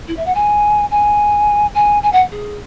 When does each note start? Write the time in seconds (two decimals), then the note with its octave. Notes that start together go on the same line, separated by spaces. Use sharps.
0.07 E4
0.16 E5
0.26 F#5
0.35 G#5
0.91 G#5
1.74 G#5
2.03 G#5
2.12 F#5
2.32 G#4